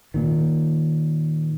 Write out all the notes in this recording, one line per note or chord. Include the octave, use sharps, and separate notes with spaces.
A#2 D#3